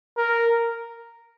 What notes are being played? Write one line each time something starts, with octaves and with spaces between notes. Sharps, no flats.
A#4